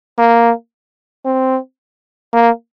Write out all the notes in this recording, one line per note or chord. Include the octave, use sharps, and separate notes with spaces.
A#3
C4
A#3